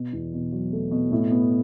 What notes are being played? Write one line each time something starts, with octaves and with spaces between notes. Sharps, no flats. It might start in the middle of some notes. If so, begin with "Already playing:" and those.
Already playing: B2
E2
B2
F#3
A3
B2
A2
B3